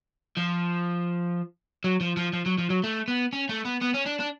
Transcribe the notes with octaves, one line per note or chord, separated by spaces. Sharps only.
F3
F#3
F3
F3
F3
F#3
F3
F#3
A3
B3
C#4
A3
B3
B3
C#4
D4
D4